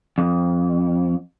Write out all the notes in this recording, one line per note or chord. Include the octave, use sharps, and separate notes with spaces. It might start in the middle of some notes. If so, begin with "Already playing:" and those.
F2